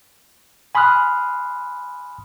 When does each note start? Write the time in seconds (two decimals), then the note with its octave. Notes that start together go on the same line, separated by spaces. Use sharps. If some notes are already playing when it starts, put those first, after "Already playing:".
0.75 G#5 B5 C6 D#6 F6 F#6